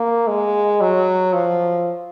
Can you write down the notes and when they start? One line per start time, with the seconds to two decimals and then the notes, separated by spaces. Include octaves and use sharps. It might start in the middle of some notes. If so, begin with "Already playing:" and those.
Already playing: A#3
0.27 G#3
0.81 F#3
1.33 F3